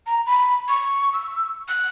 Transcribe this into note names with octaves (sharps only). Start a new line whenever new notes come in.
A#5
B5
C#6
E6
F#6